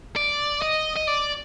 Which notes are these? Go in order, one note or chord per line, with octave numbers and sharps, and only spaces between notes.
D5
D#5
D#5
D5